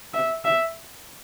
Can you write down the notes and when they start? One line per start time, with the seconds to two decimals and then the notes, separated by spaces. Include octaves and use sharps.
0.14 E5
0.45 E5